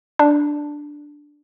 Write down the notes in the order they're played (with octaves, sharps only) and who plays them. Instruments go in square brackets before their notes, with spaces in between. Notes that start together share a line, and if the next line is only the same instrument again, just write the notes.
[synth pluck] D4